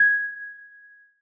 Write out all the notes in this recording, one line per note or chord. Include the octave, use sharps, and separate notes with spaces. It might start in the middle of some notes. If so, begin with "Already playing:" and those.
Already playing: G#6